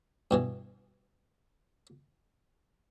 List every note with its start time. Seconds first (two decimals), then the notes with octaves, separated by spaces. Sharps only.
0.31 G2 B2 E3